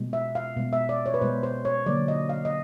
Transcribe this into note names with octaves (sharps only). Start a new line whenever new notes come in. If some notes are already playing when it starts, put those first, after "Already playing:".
Already playing: B2 G#3
E5
F5
B2 G#3
E5
D5
C#5
B4
B2 G#3 C5
C5
C#5
D3 F#3 A#3 D5
D#5
F5
D#5